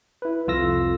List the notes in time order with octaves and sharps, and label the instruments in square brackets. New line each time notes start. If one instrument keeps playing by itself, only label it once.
[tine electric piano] E4 B4
C2 F2 F4 A4 E6 A#6